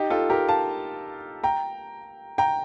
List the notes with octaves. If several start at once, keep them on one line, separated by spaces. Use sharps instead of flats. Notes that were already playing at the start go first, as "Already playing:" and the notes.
Already playing: D#4 G4
F4 A4
G4 A#4
F5 A5
G5 A#5
G5 A#5